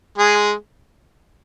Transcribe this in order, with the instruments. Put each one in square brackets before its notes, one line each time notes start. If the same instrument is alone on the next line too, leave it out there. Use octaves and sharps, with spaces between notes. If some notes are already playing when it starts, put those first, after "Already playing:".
[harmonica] G#3 G#4